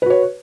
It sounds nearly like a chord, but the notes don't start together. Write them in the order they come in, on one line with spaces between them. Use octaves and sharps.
B4 F#4 C#5